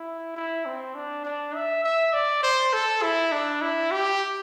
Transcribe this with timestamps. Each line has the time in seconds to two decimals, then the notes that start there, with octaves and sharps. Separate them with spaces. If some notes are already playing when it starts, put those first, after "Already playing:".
Already playing: E4
0.36 E4
0.66 C4
0.95 D4
1.25 D4
1.55 E5
1.84 E5
2.13 D5
2.43 C5
2.73 A4
3.03 E4
3.32 D4
3.62 E4
3.92 G4